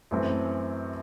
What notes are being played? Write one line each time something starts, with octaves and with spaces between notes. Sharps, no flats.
F#2 E3 A3 C4